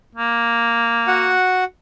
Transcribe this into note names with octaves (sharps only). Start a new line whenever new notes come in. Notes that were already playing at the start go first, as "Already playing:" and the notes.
A#3
F#4 F#5